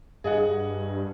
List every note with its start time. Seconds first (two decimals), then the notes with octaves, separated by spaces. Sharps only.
0.24 G2 G#4 D#5 F#5